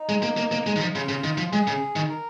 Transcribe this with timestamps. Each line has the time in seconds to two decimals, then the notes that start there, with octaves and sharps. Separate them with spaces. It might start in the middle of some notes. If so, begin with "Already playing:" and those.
Already playing: D#4
0.09 G#3
0.23 A#3
0.37 A#3
0.52 A#3
0.67 G#3
0.76 D#3
0.81 F3
0.95 C#3 F4
1.09 C#3
1.24 D#3
1.38 F3
1.52 G#3 G#4
1.67 C#3
1.96 D#3
2.09 A#4